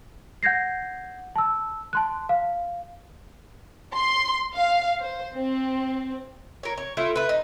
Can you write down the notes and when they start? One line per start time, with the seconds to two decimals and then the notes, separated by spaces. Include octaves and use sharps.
0.43 F#5 G6 G#6 A#6 C7
1.36 A5 E6
1.93 A5 C6 F#6
2.29 F5
3.96 C6
4.57 F5
5.01 C5
5.36 C4
6.63 A#4 C#5
6.78 C#5
6.97 A3 E4 F4
7.16 A3 B4
7.29 D#4